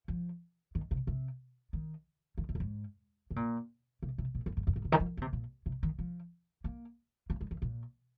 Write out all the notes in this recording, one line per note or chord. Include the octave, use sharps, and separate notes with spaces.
F3
D#3
C3
C3
D#3
D#3
C3
F2
G#2
C3
A#2
C3
C3
A#2
F2
G#2
F2
G#2
C3
D#3
F3
D#3
C3
A#2
C3
D#3
F3
A#3
A#3
G#3
D#3
A#2